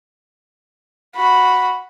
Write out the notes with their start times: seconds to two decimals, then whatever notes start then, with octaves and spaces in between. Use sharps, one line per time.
1.15 F#4 B5